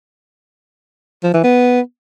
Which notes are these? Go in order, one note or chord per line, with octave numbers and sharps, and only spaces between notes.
F3
E3
B3